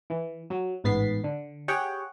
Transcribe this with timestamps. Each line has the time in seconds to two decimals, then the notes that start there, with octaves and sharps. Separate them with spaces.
0.10 E3
0.50 F#3
0.84 A1 G#2 B3 A6 B6 C7
1.24 D3
1.68 G4 G#4 C#5 F#5 G5